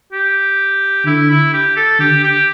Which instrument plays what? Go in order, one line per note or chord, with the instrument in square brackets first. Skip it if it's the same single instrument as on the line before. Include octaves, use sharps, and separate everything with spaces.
[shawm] G4
[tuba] D3 [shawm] E4
[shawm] E4
G4
A4
[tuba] D3 [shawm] G4
[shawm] G4